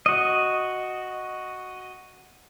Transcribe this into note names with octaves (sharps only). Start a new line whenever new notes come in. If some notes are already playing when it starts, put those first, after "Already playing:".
F#4 D#5